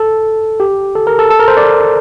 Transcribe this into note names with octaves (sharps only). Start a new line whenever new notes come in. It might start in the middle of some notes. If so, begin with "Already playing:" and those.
Already playing: A4
G4
A4
A#4
A4
A4
A#4
C5
D5